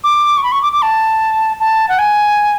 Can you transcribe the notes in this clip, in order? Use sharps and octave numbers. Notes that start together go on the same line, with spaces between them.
D6
C#6
B5
C#6
D6
D6
A5
A5
F#5
G#5